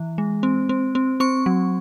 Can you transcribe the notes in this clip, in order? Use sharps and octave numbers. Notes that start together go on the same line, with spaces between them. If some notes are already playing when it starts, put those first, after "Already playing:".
Already playing: E3
G#3
C4
C4
C4
C4 C#6
F#3